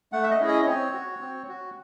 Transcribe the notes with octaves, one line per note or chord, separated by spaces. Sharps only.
A3 F#5
E5
D#5
C#4 E4 G#4
D#5
D#5
C4 C#5
F#4
C4
F#4